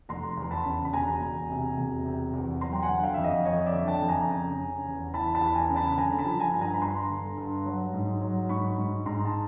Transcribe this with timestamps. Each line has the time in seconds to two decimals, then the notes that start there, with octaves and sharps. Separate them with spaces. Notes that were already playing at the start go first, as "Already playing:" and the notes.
0.09 F1 A#5 C6
0.37 E2
0.43 C6
0.51 A5 B5
0.65 C#3
0.85 B5
0.93 E1 G#5 A#5
1.21 E1
1.50 C3
1.77 E1
2.06 C3
2.33 E2
2.61 F#3 A#5 C6
2.73 G5
2.82 F#5 G#5
2.89 D3
3.03 F5 G5
3.14 F2 E5
3.24 D#5 F5
3.45 F2 C#5 D#5
3.66 D5 E5
3.73 D3
3.87 G5 A5
4.02 F2
4.08 G#5 A#5
4.29 C#3
4.57 C#3
4.85 E2
5.14 E3 A5 B5
5.35 A5 B5
5.41 E2
5.55 G#5 A#5
5.70 C#3
5.76 A5 B5
5.98 D3 G#5 A#5
6.19 A5 B5
6.26 F3
6.39 G#5 A#5
6.53 G2
6.61 G#5 A#5
6.74 B5
6.81 G2 A#5 C6
7.10 D3
7.38 G2
7.66 F#3
7.94 G#2
8.22 F#3
8.49 G#2 B5 C#6
8.78 G#2
9.06 G#2 A#5 C6
9.25 A5